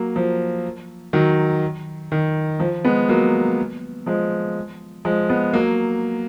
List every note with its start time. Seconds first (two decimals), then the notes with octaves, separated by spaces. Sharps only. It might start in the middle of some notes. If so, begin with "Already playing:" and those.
Already playing: F#3 A#3
0.16 F3
1.13 D#3 F#3
2.12 D#3
2.60 F3
2.85 G#3 B3
3.09 F#3 A#3
4.06 F3 G#3
5.05 F3 G#3
5.29 G#3 B3
5.53 F#3 A#3